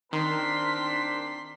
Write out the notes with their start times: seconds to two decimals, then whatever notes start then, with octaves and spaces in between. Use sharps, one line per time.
0.13 D#3 C4 D4 A#4 C6 B6